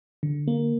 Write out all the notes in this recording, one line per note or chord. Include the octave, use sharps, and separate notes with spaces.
D3
A#3